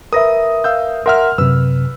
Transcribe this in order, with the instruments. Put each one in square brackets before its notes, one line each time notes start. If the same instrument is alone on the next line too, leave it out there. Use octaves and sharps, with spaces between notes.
[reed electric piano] A#4 B4 E5 [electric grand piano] D#6 A#6
[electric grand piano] F5 E6 G6
[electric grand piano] A#4 E5 F6 [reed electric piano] F#5 C6
[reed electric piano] F#2 C3 [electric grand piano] B4 E6